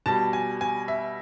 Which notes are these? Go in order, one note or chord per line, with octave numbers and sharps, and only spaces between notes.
B2 G3 A5
G#5
G#5
E5